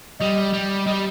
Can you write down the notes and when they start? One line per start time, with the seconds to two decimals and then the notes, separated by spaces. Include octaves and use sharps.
0.19 G3 D#5
0.54 G3
0.87 G3 D#5